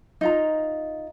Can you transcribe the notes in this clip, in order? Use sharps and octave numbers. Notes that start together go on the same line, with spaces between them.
D#4 F4 A#5